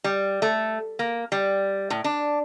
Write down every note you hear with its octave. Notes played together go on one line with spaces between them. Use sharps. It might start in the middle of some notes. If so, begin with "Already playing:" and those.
G3
A3
A#3
G3
A2
D4